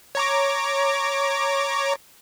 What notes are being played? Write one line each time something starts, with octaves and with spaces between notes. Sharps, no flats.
C#5 A#5 D6